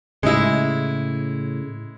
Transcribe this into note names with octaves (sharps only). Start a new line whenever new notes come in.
A2 C#3 G#3 E4